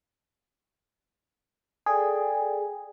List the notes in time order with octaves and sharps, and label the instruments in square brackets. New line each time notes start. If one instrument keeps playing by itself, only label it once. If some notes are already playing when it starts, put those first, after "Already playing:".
[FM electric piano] G#4 [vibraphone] A4 D5 G5